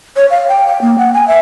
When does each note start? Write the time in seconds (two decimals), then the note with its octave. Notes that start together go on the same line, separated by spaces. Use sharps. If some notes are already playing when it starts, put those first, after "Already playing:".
0.16 C#5
0.31 F5
0.49 G5
0.67 G5
0.82 A#3
0.98 F#5
1.14 G#5
1.28 E5